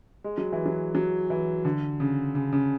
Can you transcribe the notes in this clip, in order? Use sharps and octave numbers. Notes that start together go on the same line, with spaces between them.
G#3
F#3
E3
F#3
F#3
E3
D3
C#3
C#3
C#3